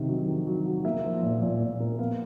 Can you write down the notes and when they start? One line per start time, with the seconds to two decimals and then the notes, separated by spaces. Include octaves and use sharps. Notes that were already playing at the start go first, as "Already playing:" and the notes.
Already playing: C3 D#3
0.08 F#3
0.28 D#3
0.47 F#3
0.66 F#3
0.85 A#3 E5
1.04 F3
1.23 A#2
1.42 A#2
1.61 A#2
1.80 A#3
1.99 B3 F5